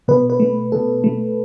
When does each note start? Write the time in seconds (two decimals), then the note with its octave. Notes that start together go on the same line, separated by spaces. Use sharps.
0.08 B2 B4
0.30 B4
0.40 A3
0.72 B2 A4
1.04 A3